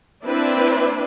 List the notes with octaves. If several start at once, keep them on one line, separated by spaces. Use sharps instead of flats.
A#3 C4 D4 E4 B4